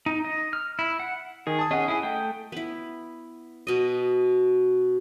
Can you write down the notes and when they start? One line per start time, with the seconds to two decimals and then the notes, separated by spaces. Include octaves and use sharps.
0.06 D#4
0.25 D#5
0.53 F6
0.79 E4
1.00 F#5
1.47 D#3 G#4
1.59 A5 D#6
1.71 C#4 G#4 D#5 F#5
1.88 E4 G#4
2.03 A3 G5
2.52 B3 E4
3.67 B2 D#5